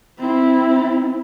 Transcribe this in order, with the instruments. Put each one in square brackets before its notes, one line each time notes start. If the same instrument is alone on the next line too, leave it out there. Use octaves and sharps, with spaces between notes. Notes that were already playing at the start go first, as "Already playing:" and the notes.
[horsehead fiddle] C4 E4